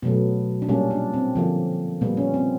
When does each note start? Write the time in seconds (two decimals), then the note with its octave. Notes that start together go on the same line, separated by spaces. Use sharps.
0.02 B2 F#3 A3 B3
0.62 D4
0.69 A#2 G3 A#3 C#4
0.91 D4
1.14 C4
1.35 D3 F3 A#3
2.01 A#2 G3 A#3 B3
2.17 C#4
2.34 C4